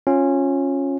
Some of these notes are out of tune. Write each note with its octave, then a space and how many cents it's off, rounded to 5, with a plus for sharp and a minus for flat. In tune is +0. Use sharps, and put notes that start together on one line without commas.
C#4 -15 F4 +15